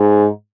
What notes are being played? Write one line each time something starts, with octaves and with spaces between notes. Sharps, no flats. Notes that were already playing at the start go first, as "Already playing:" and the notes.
Already playing: G#2